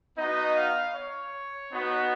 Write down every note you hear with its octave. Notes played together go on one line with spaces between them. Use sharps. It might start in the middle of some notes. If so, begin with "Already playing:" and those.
B3 D#4 F#4 D#5
F5
C#5
B3 D#4 F#4